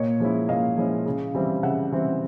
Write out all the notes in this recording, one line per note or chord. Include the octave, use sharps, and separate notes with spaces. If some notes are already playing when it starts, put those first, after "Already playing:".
Already playing: A#2 C#5 D#5
F3 G#3 C#4 E4
A#2 D#5 F5
F3 G#3 C#4 E4
C#3
E3 G3 C4
C#3 E5 F#5
E3 G3 C4